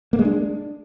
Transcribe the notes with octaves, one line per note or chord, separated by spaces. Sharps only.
A#3
G#3
D4